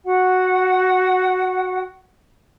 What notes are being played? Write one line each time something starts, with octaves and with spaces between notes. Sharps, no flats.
F#4 F#5